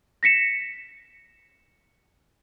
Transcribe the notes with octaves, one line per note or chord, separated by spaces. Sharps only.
A#6 B6 C#7 E7